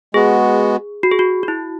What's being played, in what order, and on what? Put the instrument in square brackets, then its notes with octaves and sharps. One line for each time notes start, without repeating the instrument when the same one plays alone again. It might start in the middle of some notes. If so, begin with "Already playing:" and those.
[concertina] G#3 B3 F#4 [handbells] G#4
[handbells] F#4
G#4
F#4
F#4
E4